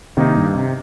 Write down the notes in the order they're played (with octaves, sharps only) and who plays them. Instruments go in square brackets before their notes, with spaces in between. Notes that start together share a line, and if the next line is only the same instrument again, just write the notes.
[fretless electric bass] C3 [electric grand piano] D#3 A#3 D#4
[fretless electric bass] G2
C3